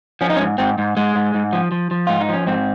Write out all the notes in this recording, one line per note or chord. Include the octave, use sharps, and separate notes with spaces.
F3 C#4
D#4
C#4
G#2
G#2 C4
G#2
G#2 G#3
G#2
G#2
F3
F3
F3
G#2 F4
D#4
F3 C#4
G#2 C4